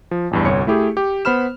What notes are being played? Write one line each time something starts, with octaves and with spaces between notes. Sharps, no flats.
F3
A1 E2 G2
G1 C2 C#5 C#7
A3 E4 G4 G#4
G4
B3 C5 B5 F6 E7